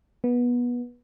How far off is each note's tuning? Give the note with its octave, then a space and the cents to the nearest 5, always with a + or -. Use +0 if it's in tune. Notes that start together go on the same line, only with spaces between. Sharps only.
B3 -20